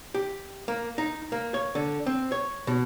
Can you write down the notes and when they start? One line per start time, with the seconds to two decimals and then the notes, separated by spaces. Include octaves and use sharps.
0.14 G4
0.68 A#3
0.98 D#4
1.32 A#3
1.54 C#5
1.75 D3
2.06 C4
2.32 C#5
2.67 B2